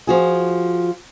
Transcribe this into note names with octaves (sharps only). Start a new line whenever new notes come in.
F3 F#4 G#4